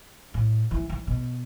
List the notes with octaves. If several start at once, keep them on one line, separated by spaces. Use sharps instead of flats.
A2
E3
E3
B2